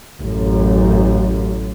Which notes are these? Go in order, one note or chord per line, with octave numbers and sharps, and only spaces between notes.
A1 F#2